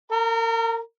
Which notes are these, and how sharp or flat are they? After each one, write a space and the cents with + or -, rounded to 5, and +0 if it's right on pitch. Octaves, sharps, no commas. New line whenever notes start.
A#4 -35 A#5 +0